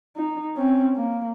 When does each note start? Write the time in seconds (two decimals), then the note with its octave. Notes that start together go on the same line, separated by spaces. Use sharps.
0.16 D#4
0.56 C4 C#4
0.96 A#3